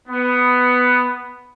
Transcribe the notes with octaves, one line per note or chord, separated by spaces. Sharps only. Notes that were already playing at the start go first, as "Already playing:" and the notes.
B3